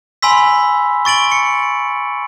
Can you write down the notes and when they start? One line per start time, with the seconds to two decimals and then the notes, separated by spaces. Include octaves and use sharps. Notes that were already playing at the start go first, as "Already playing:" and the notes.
0.22 G#5 B5 C6 E6 B6
1.05 C#6 A6 D7 F#7
1.32 C#7